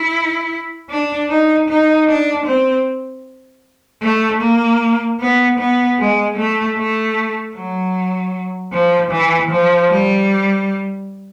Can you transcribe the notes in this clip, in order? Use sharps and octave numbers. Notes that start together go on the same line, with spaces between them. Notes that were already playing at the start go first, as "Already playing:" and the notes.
Already playing: E4
D4
D#4
D#4
D4
C4
A3
A#3
B3
B3
G#3
A3
A3
F#3
F3
E3
F3
G3